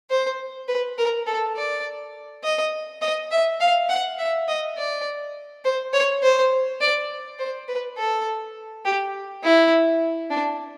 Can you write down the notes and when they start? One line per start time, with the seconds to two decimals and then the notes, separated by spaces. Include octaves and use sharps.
0.10 C5
0.68 B4
0.98 A#4
1.27 A4
1.56 D5
2.44 D#5
3.01 D#5
3.31 E5
3.60 F5
3.89 F#5
4.19 E5
4.48 D#5
4.77 D5
5.65 C5
5.93 C#5
6.23 C5
6.81 D5
7.39 C5
7.68 B4
7.98 A4
8.85 G4
9.44 E4
10.30 D4